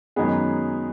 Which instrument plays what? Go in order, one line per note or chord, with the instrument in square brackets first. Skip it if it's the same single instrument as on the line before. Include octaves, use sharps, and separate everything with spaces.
[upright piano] F#2 D#3 G#3 B3 G#4